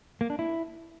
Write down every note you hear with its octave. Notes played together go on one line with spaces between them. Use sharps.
A#3
D4
E4